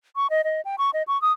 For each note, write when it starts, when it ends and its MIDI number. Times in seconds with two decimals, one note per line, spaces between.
0.16 0.27 85
0.30 0.42 75
0.44 0.61 75
0.65 0.76 79
0.78 0.91 85
0.94 1.03 75
1.07 1.20 85
1.22 1.32 87